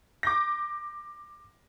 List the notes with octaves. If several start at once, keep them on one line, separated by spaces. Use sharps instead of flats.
D6 G6 A#6